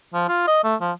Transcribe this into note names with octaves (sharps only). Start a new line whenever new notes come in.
F3
F4
D#5
A3
F3